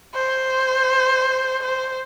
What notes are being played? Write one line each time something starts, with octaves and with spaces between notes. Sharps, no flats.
C5
C5